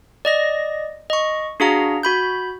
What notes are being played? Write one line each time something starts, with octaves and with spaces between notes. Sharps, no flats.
D5 D#5 A#6
D#5 C#6
D4 F#4 G#4 F5 A#5
F#4 B5 G6